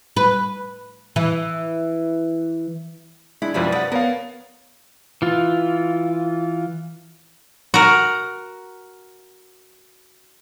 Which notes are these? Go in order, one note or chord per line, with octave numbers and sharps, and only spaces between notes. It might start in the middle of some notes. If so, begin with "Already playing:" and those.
B4
E3
G#3 D4 E4
F#2 C3 F3 G3 E4 B4
F3 B4 F#5 A6
B3 A#4 C#5 F5
E3 F4
F#4 A#4